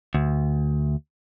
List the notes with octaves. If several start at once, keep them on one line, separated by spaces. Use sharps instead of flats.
D2